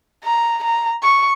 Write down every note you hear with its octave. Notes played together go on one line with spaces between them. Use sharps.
A#5
A#5
C#6